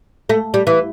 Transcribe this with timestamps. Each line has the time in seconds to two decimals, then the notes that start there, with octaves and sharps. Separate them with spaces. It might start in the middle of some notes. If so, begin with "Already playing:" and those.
0.29 A3
0.54 G3
0.67 E3